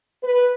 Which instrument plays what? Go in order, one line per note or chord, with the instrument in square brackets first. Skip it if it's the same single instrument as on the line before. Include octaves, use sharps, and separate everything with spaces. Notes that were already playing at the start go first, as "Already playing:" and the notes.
[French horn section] B4